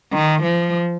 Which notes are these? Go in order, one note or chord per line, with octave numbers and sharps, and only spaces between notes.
D#3
F3